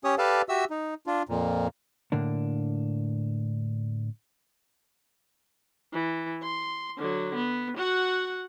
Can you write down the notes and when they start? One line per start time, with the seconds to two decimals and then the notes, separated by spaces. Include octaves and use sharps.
0.04 C#4 G4 C#5 D#6
0.18 G4 A4 B4 D5 F5 A5
0.49 F#4 G4 E5 E6
0.70 D#4
1.07 D4 F4
1.29 F2 A#2
2.12 A2 D3 A#3 D4
5.93 E3
6.43 C6
6.98 D3 F#3
7.35 B3
7.77 F#4 F#5